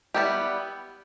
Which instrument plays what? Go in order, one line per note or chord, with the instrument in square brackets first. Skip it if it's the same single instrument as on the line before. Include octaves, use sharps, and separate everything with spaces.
[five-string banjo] G3 B3 E4 G4